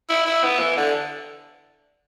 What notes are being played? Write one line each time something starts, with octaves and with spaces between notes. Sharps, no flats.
E4
E4
B3
E3
D3